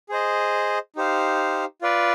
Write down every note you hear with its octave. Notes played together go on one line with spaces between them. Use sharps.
G#4 C5 D#5
D#4 G4 C5 F5
F4 B4 D5